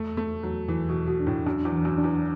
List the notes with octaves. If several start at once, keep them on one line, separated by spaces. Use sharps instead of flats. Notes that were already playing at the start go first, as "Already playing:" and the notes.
Already playing: E2 A3
E2 A3
E2 F#3
E2 E3
B2
E2
B2
D4
A2
F#2 D4
E2
E3
F#2
D4
E2